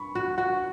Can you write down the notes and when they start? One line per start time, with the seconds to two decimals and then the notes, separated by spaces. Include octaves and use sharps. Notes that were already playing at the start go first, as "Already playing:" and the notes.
Already playing: B5 C#6
0.15 F#4
0.38 F#4 F#5